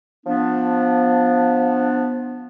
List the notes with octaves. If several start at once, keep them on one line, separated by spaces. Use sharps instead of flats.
F3 B3 D4